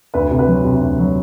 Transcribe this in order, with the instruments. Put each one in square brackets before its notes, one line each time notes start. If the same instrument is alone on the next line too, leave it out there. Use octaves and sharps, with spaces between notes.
[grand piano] D2 B4
C3
B4
F#3
C3
D2
F#3